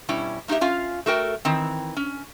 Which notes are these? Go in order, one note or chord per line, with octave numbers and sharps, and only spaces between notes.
B2 G3 C#4 E4
A#3 D#4 F#4 G4 E5
C#4 F4 F5
A3 F#4 A#4 G5
D#3 E3 C4
C#4